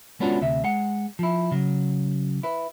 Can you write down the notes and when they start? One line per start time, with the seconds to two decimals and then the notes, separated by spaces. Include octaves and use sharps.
0.20 G#3 B3 C#4 D4 F4 F#4
0.41 D2 C3 E5
0.64 G#3 F#5
1.19 F3 E4
1.51 C#3 F#3
2.43 E4 B4